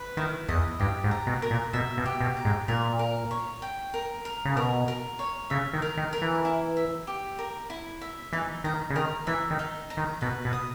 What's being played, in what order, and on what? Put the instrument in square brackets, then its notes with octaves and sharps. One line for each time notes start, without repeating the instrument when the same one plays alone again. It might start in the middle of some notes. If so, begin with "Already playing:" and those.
Already playing: [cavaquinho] B4
[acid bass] D#3 [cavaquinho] E4
[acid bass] E2 [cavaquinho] D#5
[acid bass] G2 [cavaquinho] G4
[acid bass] G#2
[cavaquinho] A#5
[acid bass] B2
[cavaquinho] A#4
[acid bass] A#2
[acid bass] B2 [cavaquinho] E5
[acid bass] B2
[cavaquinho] G4
[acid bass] B2
[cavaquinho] A#5
[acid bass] G#2
[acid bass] A#2 [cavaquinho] A#4
[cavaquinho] A#4
C#5
G5
A#4
A#4
[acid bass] C#3
[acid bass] B2 [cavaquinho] A#4
[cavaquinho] A#4
C#5
[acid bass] C#3 [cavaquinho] E5
[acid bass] D#3
[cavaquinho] A#4
[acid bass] D#3
[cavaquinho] A#4
[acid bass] E3
[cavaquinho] E4
E5
G4
A#4
E4
E5
[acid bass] E3 [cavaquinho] D#4
[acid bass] D#3 [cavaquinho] A#5
[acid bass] C#3
[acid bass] D#3 [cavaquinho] A#4
[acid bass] E3 [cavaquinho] E5
[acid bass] D#3
[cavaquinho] D#4
A#5
[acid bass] D#3
[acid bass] B2 [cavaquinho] B4
[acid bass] B2
[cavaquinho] D#6